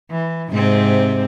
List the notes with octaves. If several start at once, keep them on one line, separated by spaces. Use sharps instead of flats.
E3
G#2 C3 C4